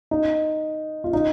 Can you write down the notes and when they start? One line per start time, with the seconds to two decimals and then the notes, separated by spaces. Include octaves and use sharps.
0.11 D#4
1.04 F4
1.13 D#4